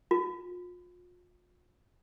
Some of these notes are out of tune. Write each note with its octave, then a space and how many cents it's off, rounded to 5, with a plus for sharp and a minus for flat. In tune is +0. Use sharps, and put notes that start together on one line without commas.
F4 +35